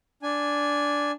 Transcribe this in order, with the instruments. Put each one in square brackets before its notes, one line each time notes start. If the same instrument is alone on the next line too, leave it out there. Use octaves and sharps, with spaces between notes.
[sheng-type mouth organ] D4 G#5